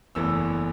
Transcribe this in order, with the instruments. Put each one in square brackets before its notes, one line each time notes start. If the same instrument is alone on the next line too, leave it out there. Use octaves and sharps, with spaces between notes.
[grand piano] F#1 E2 E3 A3 E6